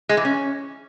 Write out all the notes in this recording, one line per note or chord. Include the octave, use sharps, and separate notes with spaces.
G#3
E3
C#4